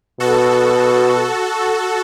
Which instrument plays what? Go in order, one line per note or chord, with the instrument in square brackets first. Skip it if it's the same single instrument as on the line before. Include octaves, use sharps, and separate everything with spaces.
[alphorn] B2 [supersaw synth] F#4 A4